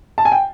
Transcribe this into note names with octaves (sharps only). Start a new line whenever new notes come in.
A5
G#5
G5